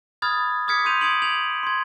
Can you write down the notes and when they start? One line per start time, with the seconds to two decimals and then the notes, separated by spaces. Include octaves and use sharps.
0.22 B5 D#6 F6 G#6 A6
0.68 D6 D#6 F6 G#6 B6 C#7
0.85 C6 G6 D#7 F7
1.01 D#6 G#6 C#7 D7 F#7
1.22 G#6 F7 F#7
1.63 C6 G#6